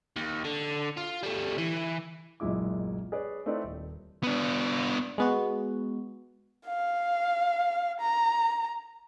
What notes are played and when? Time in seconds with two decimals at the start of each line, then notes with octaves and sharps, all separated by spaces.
0.17 D#2
0.45 D3
0.97 F4
1.23 G3 A3
1.58 E3
2.40 F#1 B1 A#2 G#3 E4 D6
3.12 G#4 B4 C#5 D5
3.46 A3 C4 D#4 E4 B4 D5
3.64 D#1
4.23 B3 D4
5.18 G#3 B3 F#4
6.66 F5
8.00 A#5